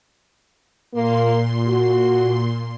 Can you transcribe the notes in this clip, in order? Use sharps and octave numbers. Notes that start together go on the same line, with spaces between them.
A#2 A#3 C6
F#4